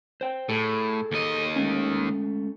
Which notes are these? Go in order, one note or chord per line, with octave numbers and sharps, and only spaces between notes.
C5 G5
A2 G#4 A4
D#2 D#5
G#3 A3 C#4